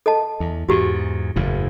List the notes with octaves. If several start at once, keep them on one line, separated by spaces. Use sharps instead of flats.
A4 D#5 A5
E2
E2 G#2 F#4 G4
F#1 E2 A2